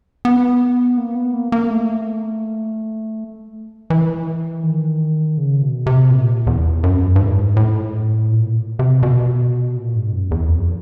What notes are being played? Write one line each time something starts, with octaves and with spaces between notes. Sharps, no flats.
B3
A#3
B3
A#3
A#3
A3
E3
D#3
C#3
B2
C3
A#2
E2
F#2
G2
G#2
A2
A#2
C3
B2
A#2
G#2
F#2
E2
F2